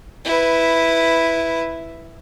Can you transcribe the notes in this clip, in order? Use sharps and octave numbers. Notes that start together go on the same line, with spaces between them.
E4 B4